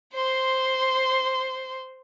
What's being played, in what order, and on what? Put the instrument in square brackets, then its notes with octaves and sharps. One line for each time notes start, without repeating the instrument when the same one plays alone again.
[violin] C5 C6